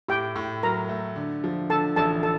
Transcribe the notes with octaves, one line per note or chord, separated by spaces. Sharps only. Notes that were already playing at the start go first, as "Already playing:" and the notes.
A2 G4 G5
A2
F#3 A#4 A#5
A3
D3
F3
D3 A4 A5
A1 A4 A5
A4 A5